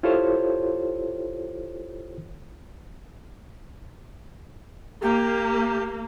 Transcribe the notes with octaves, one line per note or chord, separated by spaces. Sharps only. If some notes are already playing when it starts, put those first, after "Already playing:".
E4 F4 G4 A4 C5 C#5
A#3 G4